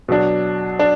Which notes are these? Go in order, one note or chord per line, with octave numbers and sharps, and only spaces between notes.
B2 F#3 D4
D4